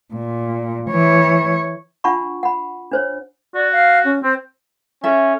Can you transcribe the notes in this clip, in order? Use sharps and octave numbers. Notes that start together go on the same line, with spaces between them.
A#2
E3 C#5
D4 F4 F#5 A5 B5 C#6
F#5 B5
D4 C5 C#5
F#4 D5
F5
C#4
C4 C5
C#4 A4 E5